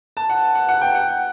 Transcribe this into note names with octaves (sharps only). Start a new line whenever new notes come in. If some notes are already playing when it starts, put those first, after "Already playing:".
A5
F#5
F#5
F#5
G5
F#5